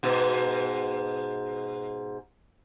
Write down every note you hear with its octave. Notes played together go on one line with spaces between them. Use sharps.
G#2 B2